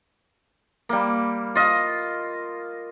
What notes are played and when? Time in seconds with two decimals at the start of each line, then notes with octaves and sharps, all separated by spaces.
0.89 G3 A#3
1.55 F4 D#5